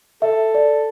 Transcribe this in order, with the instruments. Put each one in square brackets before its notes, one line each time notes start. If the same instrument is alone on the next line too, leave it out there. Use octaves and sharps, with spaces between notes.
[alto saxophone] A4 [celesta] E5
[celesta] D5